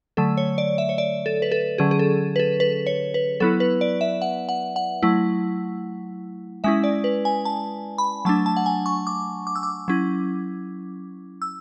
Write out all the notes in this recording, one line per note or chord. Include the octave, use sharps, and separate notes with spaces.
D3 F#3 A3 A4
C#5
D5
E5
C#5
D5
A4
B4
A4
D3 F#3 C#4 G#4
G#4
A4
B4
A4
B4
C#5
B4
F#3 B3 E4 A4
B4
D5
E5
F#5
F#5
F#5
F#3 A3 E4
G#3 C#4 E4 E5
D5
B4
G#5
A5
B5
F#3 A3 D4 A5
A5
F#5
G#5
C#6
D6
D6
E6
D6
F#3 C#4 E4
E6